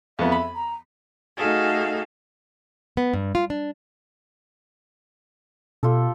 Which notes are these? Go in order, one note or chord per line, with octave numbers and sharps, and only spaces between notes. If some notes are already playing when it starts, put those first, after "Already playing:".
F2 B3 E5
B5
A#5
A3 D#4 F#4 G#4 A4 F5
B3
G2
F4
D4
B2 F4 G4 A4